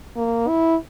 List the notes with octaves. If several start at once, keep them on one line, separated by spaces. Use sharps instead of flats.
A#3
E4